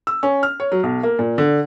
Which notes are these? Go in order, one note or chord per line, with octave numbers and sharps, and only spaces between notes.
E6
C#4
F6
C#5
F#3
B1
A#3
A#2
D3